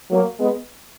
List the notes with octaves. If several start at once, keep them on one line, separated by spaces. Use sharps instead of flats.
F#3 A#3
G#3 B3